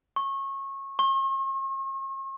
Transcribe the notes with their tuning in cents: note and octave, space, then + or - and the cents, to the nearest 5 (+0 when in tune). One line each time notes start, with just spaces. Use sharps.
C#6 -25
C#6 -45